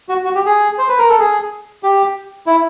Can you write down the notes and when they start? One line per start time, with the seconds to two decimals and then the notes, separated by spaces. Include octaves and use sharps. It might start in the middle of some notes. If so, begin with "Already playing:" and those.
0.09 F#4
0.24 F#4
0.35 G4
0.46 G#4
0.78 C5
0.89 B4
0.98 A#4
1.09 A4
1.19 G#4
1.83 G4
2.47 E4